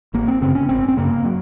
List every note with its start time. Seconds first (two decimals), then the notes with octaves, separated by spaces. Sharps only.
0.14 G#1 A#3
0.28 C4
0.41 F#2 C#3 C4
0.55 C#4
0.69 G#1 C4
0.88 C4
0.97 F#2 C#3 A#3
1.25 F#3